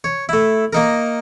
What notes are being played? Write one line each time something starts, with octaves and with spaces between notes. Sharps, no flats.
C#5
A3 E4
A#3 D#4 A#4